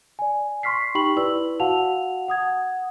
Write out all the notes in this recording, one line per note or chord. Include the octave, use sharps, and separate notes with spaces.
D5 G#5
C6 C#6 F6 B6 C7
D#4 G4 G5 B5 C#6 F#7
E4 B4 D5 E6 F#7
F#4 F5 F#5 A5 F7
F#5 D#6 G#6